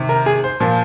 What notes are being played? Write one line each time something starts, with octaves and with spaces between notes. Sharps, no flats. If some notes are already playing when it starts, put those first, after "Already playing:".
Already playing: C3 D#3
A#4
G#4
C5
A#2 F3